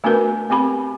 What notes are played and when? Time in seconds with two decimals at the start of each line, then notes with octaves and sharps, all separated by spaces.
0.04 A3 B3 D4 F#4 A#4 B4
0.50 B3 C4 G4 B5